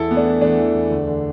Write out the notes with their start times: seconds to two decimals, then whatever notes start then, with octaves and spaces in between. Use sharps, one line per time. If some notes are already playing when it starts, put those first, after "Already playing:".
Already playing: E2 E4 A4
0.08 E3 B3
0.17 A3 D4
0.25 E3
0.41 E2 A3 D4
0.58 E3
0.74 E2
0.91 D2
1.08 D3